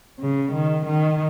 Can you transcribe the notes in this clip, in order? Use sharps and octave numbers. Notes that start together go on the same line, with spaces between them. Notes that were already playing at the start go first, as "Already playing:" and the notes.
C#3
D#3
D#3